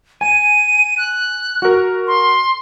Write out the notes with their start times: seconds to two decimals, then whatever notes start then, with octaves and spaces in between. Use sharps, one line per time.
0.21 G#5 D#7
0.98 F#6
1.62 F#4 A#4
2.07 C6